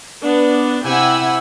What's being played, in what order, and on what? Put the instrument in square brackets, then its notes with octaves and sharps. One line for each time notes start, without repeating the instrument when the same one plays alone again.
[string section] B3 D4
C3 E4 G4 F#5 G#5 E6